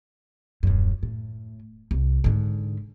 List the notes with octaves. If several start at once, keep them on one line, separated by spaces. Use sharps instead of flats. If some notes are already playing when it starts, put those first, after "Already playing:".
D#1 F#2
A2
C2
G#2 D3